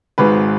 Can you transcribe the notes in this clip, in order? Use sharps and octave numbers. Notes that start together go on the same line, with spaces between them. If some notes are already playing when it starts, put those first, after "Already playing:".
G#1 G#2 G#3 B4